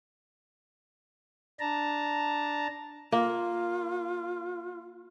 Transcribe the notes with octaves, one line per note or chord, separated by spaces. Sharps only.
D4 A5 A#5
A#3 F4